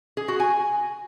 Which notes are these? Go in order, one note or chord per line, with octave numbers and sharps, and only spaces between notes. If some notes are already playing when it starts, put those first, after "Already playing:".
G#4
F#4
G#5